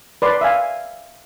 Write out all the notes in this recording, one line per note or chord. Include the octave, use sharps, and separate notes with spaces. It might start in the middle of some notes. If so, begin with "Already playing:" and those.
B4 D5 C6
E5 F5 G#5